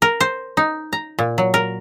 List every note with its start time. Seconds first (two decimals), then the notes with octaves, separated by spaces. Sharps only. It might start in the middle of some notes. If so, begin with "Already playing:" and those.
0.02 A#4
0.20 C5
0.57 D#4
0.93 A#5
1.19 A#2
1.38 F#3
1.54 A#4